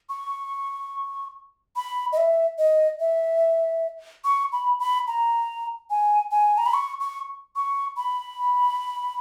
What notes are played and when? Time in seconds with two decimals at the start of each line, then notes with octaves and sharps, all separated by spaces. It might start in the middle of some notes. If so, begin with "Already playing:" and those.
0.10 C#6
1.76 B5
2.12 D#5
2.17 E5
2.58 D#5
3.00 E5
4.24 C#6
4.52 B5
4.80 B5
5.07 A#5
5.90 G#5
6.31 G#5
6.58 A#5
6.66 B5
6.74 C#6
7.00 C#6
7.56 C#6
7.97 B5